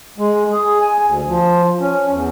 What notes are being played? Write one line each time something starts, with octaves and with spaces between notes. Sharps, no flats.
G#3
G#4
G#5
D2
F3
C#4
E2